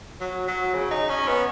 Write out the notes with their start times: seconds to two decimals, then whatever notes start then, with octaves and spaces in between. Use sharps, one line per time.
0.21 F#3
0.48 F#3
0.74 C#3
0.91 D#4
1.09 C#4
1.27 B3